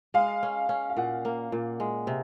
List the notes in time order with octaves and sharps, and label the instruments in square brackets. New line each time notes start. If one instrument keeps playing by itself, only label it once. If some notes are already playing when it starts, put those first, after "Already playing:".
[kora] G#3 [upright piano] F5
[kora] C#4
C#4
[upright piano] F5
[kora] A#2 [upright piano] F#5
[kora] A#3
A#2
G#3
C3